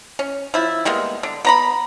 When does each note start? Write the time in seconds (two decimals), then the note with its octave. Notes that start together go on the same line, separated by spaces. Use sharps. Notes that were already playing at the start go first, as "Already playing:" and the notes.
0.19 C#4
0.54 F3 E4
0.85 G3 G#3 A#3 B3
1.23 D3
1.45 B3 A#5 B5